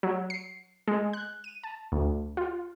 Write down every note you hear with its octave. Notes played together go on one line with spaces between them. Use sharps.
F#3
C7
G#3
F#6
D#7
A5
D2
F4